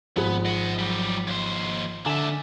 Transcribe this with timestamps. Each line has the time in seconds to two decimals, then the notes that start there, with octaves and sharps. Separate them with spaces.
0.17 G#1 F3 B3 G#4
0.45 D#5 F#5
0.79 F#3 G3
1.27 D#2 C5
2.06 D3 D4 E5 G#5 E7